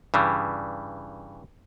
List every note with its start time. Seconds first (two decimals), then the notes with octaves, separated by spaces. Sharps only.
0.14 G2 C#3 E3 G3